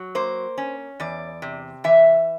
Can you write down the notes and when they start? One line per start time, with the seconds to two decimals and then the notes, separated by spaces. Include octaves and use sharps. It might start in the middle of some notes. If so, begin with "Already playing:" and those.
Already playing: F#3
0.15 A#3 C5
0.58 C#4
1.00 E2 D5
1.42 C3
1.84 E3 E5